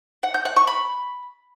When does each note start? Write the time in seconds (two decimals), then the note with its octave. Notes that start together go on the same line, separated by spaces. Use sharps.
0.23 F#5
0.34 G6
0.45 F#5
0.56 C#6
0.67 B5